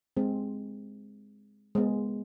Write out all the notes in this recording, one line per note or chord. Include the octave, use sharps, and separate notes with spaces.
G#3 C4
G#3 B3